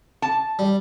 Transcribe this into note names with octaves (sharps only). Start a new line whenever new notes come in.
A5
G3